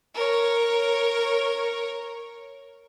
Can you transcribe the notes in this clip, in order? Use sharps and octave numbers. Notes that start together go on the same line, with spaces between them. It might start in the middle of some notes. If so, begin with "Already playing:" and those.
A#4 C#5